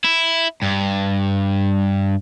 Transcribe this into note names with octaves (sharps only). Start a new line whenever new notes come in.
E4
G2